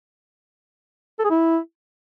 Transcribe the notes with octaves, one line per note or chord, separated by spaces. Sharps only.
A4
G#4
E4